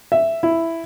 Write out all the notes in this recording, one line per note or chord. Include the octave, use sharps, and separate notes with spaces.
E5
E4